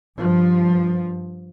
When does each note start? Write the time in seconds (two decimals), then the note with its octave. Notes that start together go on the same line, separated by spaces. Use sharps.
0.17 G2 F3